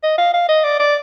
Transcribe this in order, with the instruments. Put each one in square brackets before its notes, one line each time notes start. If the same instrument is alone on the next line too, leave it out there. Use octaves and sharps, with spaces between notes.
[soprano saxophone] D#5
F5
F5
D#5
D5
D5